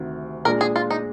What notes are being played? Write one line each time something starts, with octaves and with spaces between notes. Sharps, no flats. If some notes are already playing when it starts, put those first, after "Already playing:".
Already playing: D2 C3 D#3
A#2 G#3 D4 A#4
G#4
F4
D#4